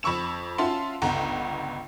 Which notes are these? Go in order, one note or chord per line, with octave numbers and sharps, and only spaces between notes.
F2 B5 C#6 E6 E7
C#4 F4 F#4 E5 A5 C6
G1 C#2 F#5 A#5